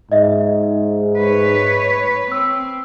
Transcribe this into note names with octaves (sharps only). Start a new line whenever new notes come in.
G#2 D#5 E5
B4 C#5
C4 E6